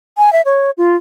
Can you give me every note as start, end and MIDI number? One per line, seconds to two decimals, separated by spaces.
0.18 0.32 80
0.33 0.42 76
0.45 0.71 73
0.78 0.96 65